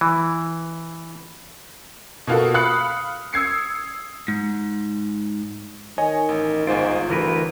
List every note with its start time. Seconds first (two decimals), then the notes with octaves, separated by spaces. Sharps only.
0.01 E3
2.27 B2 A#3 F4 F#4 A4
2.54 F5 B5 D#6 F#6 C#7
3.33 D#6 E6 G#6 C7 C#7
4.28 G#2
5.98 D#3 C#5 D#5 G#5
6.29 A1
6.67 G1 G#2 F4 C5 D7
7.10 D2 E3 A#4 B4